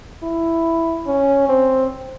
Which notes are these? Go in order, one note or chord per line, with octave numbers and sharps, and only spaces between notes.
E4
C#4
C4